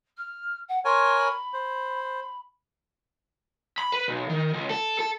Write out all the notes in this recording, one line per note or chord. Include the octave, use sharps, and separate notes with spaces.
F6
F#5
A#4 C#5 G#5 C6
B5
C5
B5
B4
B1
D#3
C#2
A4
A4